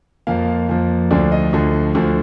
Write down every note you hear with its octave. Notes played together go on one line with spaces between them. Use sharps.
F2 F3 A#3 F5
F2 F3 A#3
D2 D3 F3 D5
D#5
D2 D3 F3
D2 D3 F3